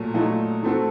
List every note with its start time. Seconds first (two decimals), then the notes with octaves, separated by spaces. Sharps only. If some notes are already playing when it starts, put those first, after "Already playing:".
Already playing: A#2 F#3 A3
0.14 A#2 F#3 A3 D#4
0.62 D#3 A3 C4 F#4 A4